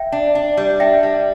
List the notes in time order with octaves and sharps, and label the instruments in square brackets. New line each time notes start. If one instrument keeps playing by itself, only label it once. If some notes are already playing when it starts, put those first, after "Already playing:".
Already playing: [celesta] E5 G5
[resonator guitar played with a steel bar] D4
D4
G3
[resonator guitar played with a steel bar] D4 [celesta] E5 G5
[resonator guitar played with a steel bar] G3